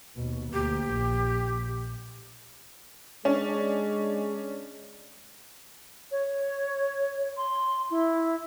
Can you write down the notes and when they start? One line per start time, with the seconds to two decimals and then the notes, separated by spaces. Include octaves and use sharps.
0.16 D#2 B2
0.53 D2 A#3 G4
0.86 A#1
3.25 G#3 C#4 D4
6.11 C#5
7.37 C6
7.91 E4